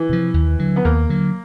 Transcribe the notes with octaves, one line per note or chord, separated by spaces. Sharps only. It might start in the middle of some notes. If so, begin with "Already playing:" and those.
Already playing: E3
C3 F3
D#2
D3 F#3
B3
D#2 A#3
D3 F#3